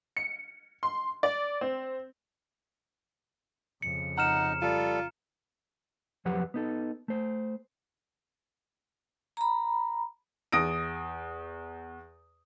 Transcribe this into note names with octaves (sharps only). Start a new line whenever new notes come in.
C#7
C6
D5
C4
F2 C#3 C#7
D#4 F#5 A#5 F6 E7
G3 F4 A4
F2 F3 F#3 G4 B4 F#5
B3 D#4 A4
A3 C5
A#5 B5
E2 D#6 A#6 D7